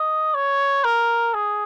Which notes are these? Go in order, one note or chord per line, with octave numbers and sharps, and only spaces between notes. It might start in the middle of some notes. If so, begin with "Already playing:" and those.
Already playing: D#5
C#5
A#4
G#4